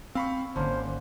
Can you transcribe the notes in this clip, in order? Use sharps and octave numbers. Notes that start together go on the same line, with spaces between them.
C4 F5 B5 C#6
G#1 D3 A#3 C#4 C5